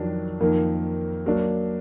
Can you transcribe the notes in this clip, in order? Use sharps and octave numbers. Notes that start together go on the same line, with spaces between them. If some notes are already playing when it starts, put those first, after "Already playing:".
Already playing: F2 D#3 F#3 D4
F2 D#3 A#3
F#3 A#3 D4